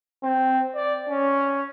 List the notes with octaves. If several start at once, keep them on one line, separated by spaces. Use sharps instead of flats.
C4
D5
C#4